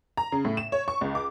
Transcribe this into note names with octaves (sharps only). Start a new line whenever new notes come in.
A#5
C#3
A2
E7
C#5
C#6
C#2
D6